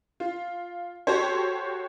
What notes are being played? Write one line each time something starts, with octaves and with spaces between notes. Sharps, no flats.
F4
F#4 G4 A4 C5 C#5